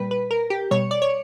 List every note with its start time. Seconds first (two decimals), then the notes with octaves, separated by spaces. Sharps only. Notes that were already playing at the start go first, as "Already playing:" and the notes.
Already playing: A#2 G3 B4
0.11 B4
0.31 A#4
0.50 G4
0.71 B2 G3 C#5
0.91 D5
1.02 C#5